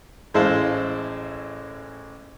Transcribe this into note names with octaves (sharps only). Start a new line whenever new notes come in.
A1 G#3 E4 C5 F5 A5